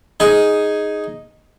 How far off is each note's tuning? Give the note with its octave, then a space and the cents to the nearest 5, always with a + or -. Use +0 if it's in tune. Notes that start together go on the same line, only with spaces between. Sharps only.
D#4 +0 G#4 +0